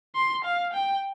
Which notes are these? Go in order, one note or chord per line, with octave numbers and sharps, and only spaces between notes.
C6
F5
G5